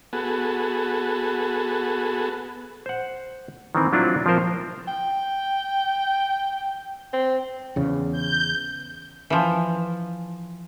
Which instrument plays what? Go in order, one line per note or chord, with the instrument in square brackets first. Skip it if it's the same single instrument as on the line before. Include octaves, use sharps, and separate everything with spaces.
[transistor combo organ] B3 F#4 G#4 A4
[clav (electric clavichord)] C5 F#5
D#3 E3 C4
F#3 C4 D4 E4 F4
F3 C4 F4 A#4 C5
[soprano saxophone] G5
C4
[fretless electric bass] E2 C#3
[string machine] G6
[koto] E3 F3